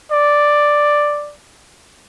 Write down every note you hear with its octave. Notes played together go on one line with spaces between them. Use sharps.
D5